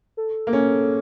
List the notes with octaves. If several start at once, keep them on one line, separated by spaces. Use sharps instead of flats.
A4
A#3
C#4